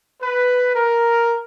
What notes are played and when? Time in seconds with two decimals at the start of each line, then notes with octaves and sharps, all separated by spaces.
0.21 B4
0.74 A#4